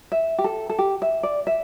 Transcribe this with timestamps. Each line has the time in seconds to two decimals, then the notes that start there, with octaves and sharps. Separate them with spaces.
0.12 E5
0.38 G4
0.44 A4
0.70 A4
0.79 G4
1.02 E5
1.23 D5
1.47 E5